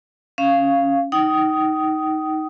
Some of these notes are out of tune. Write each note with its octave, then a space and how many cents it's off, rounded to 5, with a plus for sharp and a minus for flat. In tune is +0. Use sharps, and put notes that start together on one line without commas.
C#4 +0 F5 -10
D#4 +10 G5 -35 D#6 +5